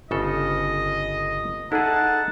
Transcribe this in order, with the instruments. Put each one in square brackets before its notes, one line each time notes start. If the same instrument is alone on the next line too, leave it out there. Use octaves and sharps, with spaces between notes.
[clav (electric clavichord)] G1 C#3 A4 [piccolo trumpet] D#5
[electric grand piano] D#4 A4 [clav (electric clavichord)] E4 G#4 [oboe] F#5 [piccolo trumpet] A5